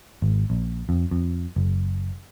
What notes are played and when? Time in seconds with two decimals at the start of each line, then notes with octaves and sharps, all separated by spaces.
0.22 G#1
0.50 A#1
0.89 F2
1.11 F2
1.56 F#1